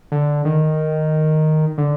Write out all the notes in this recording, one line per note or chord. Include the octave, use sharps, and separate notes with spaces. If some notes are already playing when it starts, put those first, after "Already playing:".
D3
D#3
D3